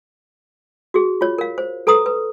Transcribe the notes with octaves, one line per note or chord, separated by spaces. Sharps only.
F#4 G#4
F4 C#5
A#4 F5
C5
A4 B4 A#5 D#6
B4